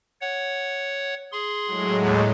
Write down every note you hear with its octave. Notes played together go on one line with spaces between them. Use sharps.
C#5 F#5
G#4 C6
A2 F#3 G#3
D#2